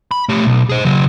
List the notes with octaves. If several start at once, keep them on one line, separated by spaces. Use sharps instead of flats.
B5
A3 G4
B1
G#4 C5
C#3 F#3